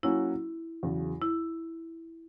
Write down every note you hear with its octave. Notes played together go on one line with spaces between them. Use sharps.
F#3 A#3 C#4 E4 F#4
E2 C#3 F#3
E4